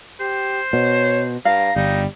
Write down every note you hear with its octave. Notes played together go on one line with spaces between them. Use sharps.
G4 C5
B2 C#5
G2 F5 A#5
G1 G3 D#4